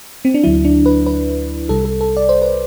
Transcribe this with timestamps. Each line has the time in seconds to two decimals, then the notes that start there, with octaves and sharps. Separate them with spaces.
0.25 C4
0.34 D4
0.44 D2 D3 F#3 E4
0.65 D4
0.86 B4
1.06 B4
1.69 C2 C3 G3 A4
1.85 A4
2.01 A4
2.17 D5
2.29 C5
2.42 B4